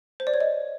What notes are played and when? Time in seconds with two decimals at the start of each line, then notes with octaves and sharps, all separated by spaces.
0.20 C5
0.27 D5
0.34 C#5
0.40 D#5